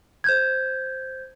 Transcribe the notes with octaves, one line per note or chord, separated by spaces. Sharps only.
C5 G6 G#6